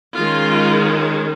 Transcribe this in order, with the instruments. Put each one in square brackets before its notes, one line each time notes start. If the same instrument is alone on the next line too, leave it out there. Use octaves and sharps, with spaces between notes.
[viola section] D#3 G#3 C#4 F4